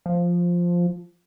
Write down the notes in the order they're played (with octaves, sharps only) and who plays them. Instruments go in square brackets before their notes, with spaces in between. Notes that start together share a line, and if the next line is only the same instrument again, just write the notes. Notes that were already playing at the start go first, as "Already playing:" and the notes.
[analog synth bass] F3